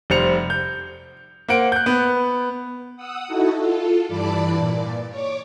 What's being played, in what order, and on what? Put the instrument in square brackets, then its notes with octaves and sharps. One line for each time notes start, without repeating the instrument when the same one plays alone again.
[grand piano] F1 G3 C5 C#7 F7
G6
A#3 C5 F#5 D7
F#6 G6
B3
[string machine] F#5 D#6 E6
D#4 E4 F#4 A4
F4 A4
G2 E3 D5 A5 B5 D6
A#2 D5
C#5 D6